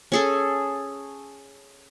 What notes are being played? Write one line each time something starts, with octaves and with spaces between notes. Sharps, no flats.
C#4 G#4 A4